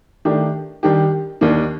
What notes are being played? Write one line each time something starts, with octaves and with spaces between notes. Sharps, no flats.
D#3 A3 D4 G4
D#3 G3 D4 G4
D#2 D#3 A#3 D4